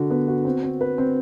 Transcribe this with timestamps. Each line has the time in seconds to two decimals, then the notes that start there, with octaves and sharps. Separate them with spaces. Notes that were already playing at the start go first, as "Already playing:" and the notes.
Already playing: D3 F#4
0.10 B3
0.28 F#4
0.45 C4
0.63 C4
0.81 B4
0.98 C4